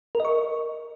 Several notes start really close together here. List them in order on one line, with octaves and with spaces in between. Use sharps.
A#4 D#5 C#6